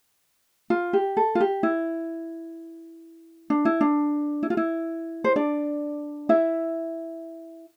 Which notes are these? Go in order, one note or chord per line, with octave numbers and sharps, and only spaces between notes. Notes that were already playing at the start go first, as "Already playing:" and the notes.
F4
G4
A4
F4
G4
E4
D4
E4
D4
E4
F4
E4
C5
D4 D5
E4 E5